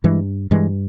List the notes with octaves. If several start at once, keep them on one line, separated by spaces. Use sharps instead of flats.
G2 E3 G#3
G2 E3 G#3